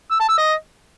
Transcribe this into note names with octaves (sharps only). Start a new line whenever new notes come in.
E6
A5
E6
D#5